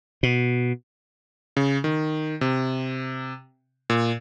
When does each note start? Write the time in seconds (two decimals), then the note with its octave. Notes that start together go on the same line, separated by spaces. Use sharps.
0.23 B2
1.57 C#3
1.84 D#3
2.41 C3
3.90 A#2